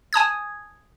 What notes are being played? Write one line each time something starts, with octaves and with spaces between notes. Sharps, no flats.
G#5 A5 D#6 G#6